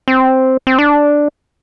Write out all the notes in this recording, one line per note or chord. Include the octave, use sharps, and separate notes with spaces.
C4
C4
D4